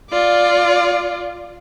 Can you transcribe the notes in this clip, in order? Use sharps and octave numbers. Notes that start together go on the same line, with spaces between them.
F4 D5